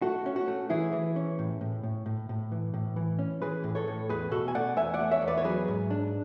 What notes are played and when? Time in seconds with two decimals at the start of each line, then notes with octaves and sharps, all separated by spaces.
0.02 A3 F#4
0.26 C#4
0.36 F#4
0.48 A3
0.70 E3 E4 G#4
0.93 E3
1.16 C#4
1.39 A2
1.61 A2
1.83 A2
2.06 A2
2.29 A2
2.52 E3
2.74 A2
2.96 E3
3.19 C#4
3.42 E3 G#4 B4
3.64 A2
3.75 A4 C#5
3.87 A2
4.09 E2 G#4 B4
4.31 B2 F#4 A4
4.48 G#5
4.55 A3 D5 F#5
4.76 E2 E5 G#5
4.94 D5 F#5
5.00 A3
5.11 C#5 E5
5.22 E2
5.28 B4 D5
5.37 C#5
5.44 F#3 G#4 B4
5.68 G#2
5.90 D4